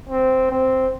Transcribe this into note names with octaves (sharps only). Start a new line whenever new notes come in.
C4
C4